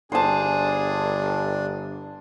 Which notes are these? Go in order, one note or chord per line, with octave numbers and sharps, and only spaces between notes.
G1 D4 G#4 C5 A5